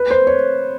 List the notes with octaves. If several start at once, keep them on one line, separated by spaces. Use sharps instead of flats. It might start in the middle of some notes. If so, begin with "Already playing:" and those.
Already playing: B4
C5
C#5